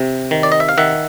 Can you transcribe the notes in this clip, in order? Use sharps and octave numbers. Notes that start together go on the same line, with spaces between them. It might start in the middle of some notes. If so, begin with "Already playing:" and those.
Already playing: C3
D#3
D5
D#5
E5
F5
D#3 E5 F#5